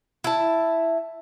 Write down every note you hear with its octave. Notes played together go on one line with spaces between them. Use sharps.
E4 A5